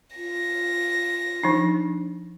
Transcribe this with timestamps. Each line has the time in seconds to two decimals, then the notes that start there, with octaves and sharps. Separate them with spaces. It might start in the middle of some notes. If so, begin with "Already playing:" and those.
0.17 F4 A#6
1.43 F3 D4 D#4